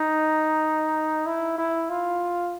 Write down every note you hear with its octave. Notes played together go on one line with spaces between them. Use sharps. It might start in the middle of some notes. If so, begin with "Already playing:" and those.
Already playing: D#4
E4
E4
F4